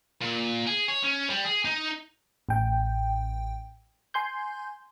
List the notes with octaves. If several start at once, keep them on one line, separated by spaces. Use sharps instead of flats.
A#2
G#4
C#5
C#4
G3
G#4
D#4
A1 G5
G#5 C6 G6